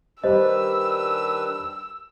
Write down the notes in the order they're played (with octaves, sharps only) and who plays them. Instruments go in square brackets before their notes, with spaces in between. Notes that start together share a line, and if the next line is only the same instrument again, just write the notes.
[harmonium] D#3 D4 B4 [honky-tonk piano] G3 [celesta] C5 D#5 [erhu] E6